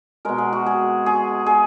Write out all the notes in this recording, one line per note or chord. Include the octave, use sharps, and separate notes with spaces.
B2 G#3 A#4
G#4
F#4
G#4
G#4
G#4